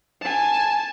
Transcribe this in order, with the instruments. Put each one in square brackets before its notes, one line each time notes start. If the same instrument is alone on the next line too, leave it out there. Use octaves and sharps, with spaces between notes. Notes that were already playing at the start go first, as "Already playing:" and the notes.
[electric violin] G#5 A5